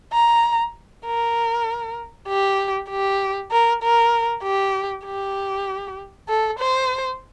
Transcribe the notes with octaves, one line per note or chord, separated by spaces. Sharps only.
A#5
A#4
G4
G4
A#4
A#4
G4
G4
A4
C5